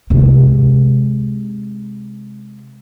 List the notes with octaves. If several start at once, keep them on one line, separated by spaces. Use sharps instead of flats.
C3 G#3